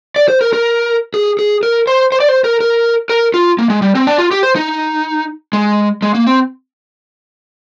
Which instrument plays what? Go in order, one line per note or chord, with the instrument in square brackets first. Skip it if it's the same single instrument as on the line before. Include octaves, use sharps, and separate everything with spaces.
[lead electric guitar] D5
C5
A#4
A#4
G#4
G#4
A#4
C5
C5
D5
C5
A#4
A#4
A#4
F4
A#3
G#3
G3
C4
D4
F4
G4
C5
D#4
G#3
G#3
A#3
C4